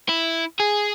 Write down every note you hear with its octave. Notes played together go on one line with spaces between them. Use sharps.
E4
G#4